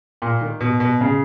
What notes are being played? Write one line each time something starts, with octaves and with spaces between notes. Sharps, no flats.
A#2
D#3
B2
B2
C#3